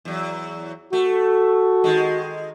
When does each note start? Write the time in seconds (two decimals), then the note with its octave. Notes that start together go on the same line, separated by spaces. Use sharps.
0.05 E2 F#3
0.93 A3 F#4
1.84 D#3 G#3